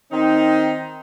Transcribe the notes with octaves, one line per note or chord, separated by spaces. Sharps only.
D#3 C4 D#4